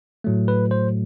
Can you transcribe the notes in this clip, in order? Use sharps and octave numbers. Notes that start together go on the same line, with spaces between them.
A2 F#3 A3
B4
C5